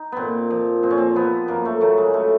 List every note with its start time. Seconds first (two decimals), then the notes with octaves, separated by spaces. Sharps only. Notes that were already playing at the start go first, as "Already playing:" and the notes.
Already playing: D#4
0.12 A#2 B3 C4
0.50 F3
0.83 A#2 C4
0.91 C#4
0.98 C4
1.15 F3 B3
1.48 F#2 A#3
1.65 A3
1.81 C#3 F#3 A3
1.98 G#3
2.14 A3